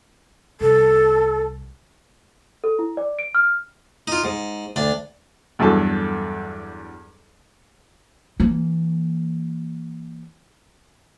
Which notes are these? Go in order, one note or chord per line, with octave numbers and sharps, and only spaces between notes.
C2 A4
A4
E4
D5
D7
F6
D#4 F4
G#2
D2 D4
E2 G2 F#3 A4 A5
E3 A#3